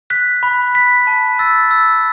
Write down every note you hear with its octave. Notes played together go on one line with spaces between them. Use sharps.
F#6 B6
B5
F#6 B6
A5
E6 A6
E6